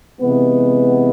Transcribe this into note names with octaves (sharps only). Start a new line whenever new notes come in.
C3 E3 G#3 B3